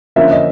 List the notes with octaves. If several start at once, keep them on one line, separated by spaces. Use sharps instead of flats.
D3 F3 A#3 C#4 E5
D#5